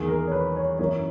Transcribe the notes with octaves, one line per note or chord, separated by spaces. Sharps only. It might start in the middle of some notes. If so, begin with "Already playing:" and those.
Already playing: E2 D#3 A#3 G#4
A#4
C#5
B4
C#5
F#2 E3 A#3 C#5